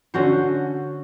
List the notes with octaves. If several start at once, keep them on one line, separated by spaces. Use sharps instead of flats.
D3 C#4 F#4 C5